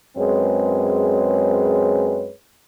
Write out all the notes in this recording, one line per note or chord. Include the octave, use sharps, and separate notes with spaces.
F#2 G#3 C4 G#4 B4 C#5